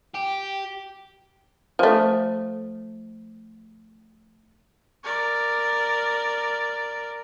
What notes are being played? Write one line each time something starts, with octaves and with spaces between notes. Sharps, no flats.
G4
F3 A3
A#4 D5